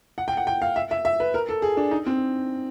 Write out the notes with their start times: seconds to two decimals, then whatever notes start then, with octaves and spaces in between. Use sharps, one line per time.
0.18 F#5
0.28 G5
0.37 F#5
0.47 G5
0.62 F5
0.76 E5
0.91 E5
1.05 E5
1.20 B4
1.34 A#4
1.49 A4
1.62 G#4
1.77 D4
1.91 D#4
2.06 C4